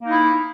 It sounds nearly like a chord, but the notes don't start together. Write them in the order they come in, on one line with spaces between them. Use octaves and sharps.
A#3 D#4 E4